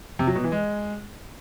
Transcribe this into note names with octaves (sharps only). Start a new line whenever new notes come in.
C3
F#3
B2
E3
G#3